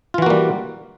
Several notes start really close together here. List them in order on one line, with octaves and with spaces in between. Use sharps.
F4 E3 F#4 A#3 G3